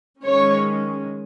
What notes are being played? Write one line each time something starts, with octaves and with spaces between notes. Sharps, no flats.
D#3 G#3 C#4 C#5